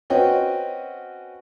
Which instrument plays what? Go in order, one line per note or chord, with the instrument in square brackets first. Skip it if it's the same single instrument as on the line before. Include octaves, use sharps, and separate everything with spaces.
[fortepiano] C4 C#4 F#4 B4 D#5 G5